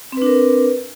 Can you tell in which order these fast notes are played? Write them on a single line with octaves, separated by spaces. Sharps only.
C4 B4 D4 A#4